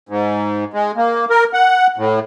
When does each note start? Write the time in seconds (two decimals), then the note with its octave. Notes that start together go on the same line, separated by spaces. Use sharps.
0.09 G#2
0.73 G#3
0.97 A#3
1.30 A#4
1.53 F#5
1.98 A2